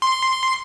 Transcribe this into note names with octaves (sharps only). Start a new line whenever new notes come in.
C6